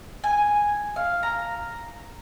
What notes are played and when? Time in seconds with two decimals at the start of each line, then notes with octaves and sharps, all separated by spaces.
0.24 G#5
0.96 F5
1.23 A#5